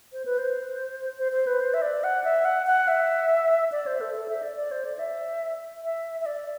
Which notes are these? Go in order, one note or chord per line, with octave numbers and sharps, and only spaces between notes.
C5
B4
C5
C5
C5
B4
C5
E5
D5
F#5
E5
F#5
F#5
E5
D5
C5
A4
A4
E5
D5
D5
C5
D5
E5
E5
E5
D5